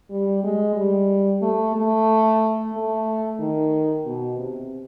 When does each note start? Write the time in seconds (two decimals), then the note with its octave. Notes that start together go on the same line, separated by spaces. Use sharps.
0.10 G3
0.43 G#3
0.76 G3
1.42 A3
1.76 A3
2.74 A3
3.40 D#3
4.06 B2
4.38 C3